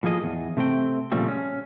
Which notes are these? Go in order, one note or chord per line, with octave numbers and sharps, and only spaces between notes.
A2 F3 A#3 G#4 D#5
E2
C3 A3 C4 G5
A#2 C#3 F3 G3 A3 C4
C#4